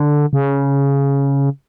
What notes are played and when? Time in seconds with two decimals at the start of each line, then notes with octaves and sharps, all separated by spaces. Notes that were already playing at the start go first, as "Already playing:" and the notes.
Already playing: D3
0.33 C#3